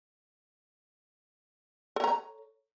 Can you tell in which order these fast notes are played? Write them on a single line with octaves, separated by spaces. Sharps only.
A4 C#5 A#5